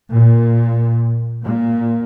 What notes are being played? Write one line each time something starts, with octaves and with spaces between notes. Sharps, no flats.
A#2
A#2